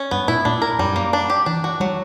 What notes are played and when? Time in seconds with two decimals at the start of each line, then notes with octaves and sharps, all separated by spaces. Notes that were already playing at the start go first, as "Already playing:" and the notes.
Already playing: C#4
0.11 G2 B3
0.28 A#2 E4
0.45 A#2 D4
0.62 A#4
0.79 F#2 G3
0.96 A#3
1.13 D4
1.30 G4
1.46 E3 D4
1.64 F#4
1.80 F#3 G3